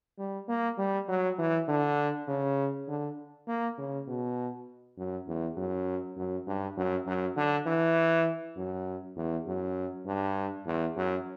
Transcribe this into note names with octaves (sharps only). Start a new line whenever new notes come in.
G3
A#3
G3
F#3
E3
D3
C#3
D3
A#3
C#3
B2
F#2
E2
F#2
F#2
G2
F#2
F#2
D3
E3
F#2
E2
F#2
G2
E2
F#2